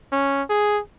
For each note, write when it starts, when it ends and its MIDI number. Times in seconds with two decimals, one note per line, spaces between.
0.12 0.43 61
0.50 0.80 68